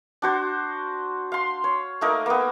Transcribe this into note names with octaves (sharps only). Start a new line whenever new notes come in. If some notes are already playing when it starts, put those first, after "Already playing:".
D4 F#4 C5
F5 C6
C#5
A3 A#3 D#4 A#4
A#3 B3